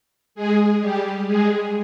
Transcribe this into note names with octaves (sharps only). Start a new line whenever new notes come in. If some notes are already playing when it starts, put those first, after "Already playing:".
G#3 G#4
G3 G4
G#3 G#4